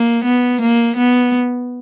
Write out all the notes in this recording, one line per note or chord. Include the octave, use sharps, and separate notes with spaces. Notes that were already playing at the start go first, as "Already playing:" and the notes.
Already playing: A#3
B3
A#3
B3